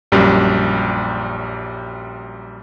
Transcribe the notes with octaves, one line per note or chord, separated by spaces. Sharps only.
A#1 F#2 G3